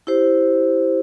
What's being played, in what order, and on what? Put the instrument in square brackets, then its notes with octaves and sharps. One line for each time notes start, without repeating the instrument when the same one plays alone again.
[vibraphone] E4 G4 C5